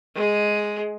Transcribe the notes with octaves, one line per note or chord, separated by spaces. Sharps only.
G#3 G#4